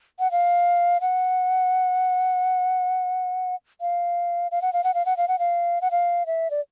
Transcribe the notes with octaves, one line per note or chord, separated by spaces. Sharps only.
F#5
F5
F#5
F5
F5
F#5
F5
F#5
F5
F#5
F5
F#5
F5
F#5
F5
E5
D5